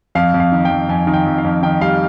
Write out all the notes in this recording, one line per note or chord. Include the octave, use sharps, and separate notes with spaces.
F2 F5
F2
F5
D#3
G5
F2
F2 G#5
D#3
G5
F2
F5
F2
D#3 G5
G3 F5